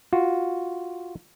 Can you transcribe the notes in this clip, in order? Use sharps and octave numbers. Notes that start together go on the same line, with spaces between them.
F4 F#4